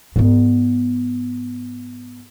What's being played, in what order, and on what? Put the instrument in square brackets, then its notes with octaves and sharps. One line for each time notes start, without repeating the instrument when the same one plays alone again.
[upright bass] G#2 B3